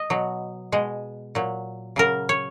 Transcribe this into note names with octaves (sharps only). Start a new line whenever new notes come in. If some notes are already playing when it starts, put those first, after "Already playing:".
Already playing: D#5
B2 F#3
B2 G#3
A#2 F#3
C#3 F#3 A#4
C#5